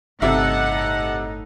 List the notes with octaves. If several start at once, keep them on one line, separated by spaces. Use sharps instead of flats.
G1 A2 C3 D#4 A4 E5 F#5